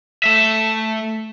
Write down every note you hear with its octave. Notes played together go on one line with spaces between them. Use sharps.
A3 E5